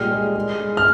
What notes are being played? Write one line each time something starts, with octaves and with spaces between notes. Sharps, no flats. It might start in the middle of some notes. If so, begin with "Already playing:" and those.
Already playing: A#2 G3 G#3 F6
G#3
G#3
G#3
F6